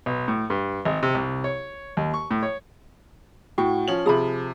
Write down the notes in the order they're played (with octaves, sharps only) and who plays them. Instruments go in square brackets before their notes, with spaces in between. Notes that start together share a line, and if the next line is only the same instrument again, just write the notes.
[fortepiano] B1
A2
G2
G#1
C3
C2
C#5
D#2
C#6
A2
C#5
[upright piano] A2 [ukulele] F#4 G5
[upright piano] F3 C#4 F#7
[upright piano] C3 F3 [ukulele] G#4 A#5 B5